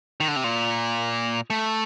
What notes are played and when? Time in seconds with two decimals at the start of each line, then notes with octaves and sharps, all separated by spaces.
0.20 D#3
0.28 D3
0.36 C3
0.44 A#2
1.50 A3